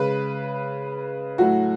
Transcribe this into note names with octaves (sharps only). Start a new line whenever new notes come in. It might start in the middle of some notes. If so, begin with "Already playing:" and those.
Already playing: C#3 G#3 B4
A2 F#3 A3 F#4